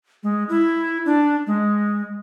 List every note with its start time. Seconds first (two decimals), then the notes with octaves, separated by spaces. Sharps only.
0.23 G#3
0.49 E4
1.06 D4
1.47 G#3